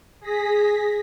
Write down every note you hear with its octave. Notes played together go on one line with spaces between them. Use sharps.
G#4 A#6 B6